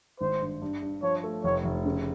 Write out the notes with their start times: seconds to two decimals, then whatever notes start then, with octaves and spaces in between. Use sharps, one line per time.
0.20 G#1 C5
0.41 G2
0.62 G2
0.83 G2
1.03 F3 C#5
1.24 A3
1.44 F1 C#5
1.65 F1
1.85 C#3